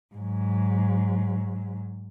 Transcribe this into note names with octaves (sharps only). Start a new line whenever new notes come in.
G#2 F#3